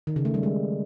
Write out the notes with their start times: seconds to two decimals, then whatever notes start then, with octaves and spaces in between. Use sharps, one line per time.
0.07 D#3
0.16 C#3
0.25 A3
0.34 G3
0.43 G#3